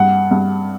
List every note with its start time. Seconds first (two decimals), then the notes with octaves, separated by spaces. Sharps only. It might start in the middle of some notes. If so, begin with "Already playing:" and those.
Already playing: G2 F#5
0.31 G2